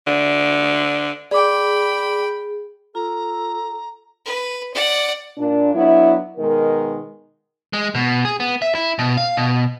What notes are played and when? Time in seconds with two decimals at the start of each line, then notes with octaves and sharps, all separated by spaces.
0.07 D3
1.31 G#4 D5 G5 B5 D6
2.95 F4 A4 A#5
4.25 B4
4.74 D5 F#5
5.38 A#2 D4
5.75 F#3 B3 D4 E4
6.38 B2 D#3 G#3 A#4
7.73 G#3
7.95 B2
8.25 G#4
8.40 B3
8.62 E5
8.75 E4
8.99 B2
9.17 F5
9.37 B2